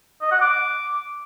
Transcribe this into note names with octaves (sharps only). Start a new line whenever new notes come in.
D#5
F#5
D6